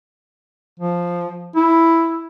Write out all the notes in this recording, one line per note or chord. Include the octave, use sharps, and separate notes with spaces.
F3
E4